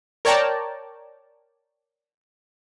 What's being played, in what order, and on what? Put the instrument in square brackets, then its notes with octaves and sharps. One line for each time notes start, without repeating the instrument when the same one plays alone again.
[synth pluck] A#4 C#5 D5 G5 A5 A#5